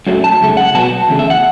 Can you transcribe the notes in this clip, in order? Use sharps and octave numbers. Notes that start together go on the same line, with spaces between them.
F#2 F#3 A3
A5
F#2 C#3 A3
F#5
B2 F#3 B3 A5
E2 C#3 A3
E5
F#5